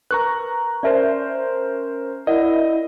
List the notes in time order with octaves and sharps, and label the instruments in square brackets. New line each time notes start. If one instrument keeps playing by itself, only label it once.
[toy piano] A#4 B4 [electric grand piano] A#5 C#6 F#6
[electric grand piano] C#4 A#4 C5 [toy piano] D5 E5 A5
[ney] E4 [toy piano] A#4 D5 F#5 [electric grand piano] D#5